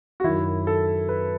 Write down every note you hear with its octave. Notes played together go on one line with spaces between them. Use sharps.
F#4
F#2 D#3 E4
A4
B4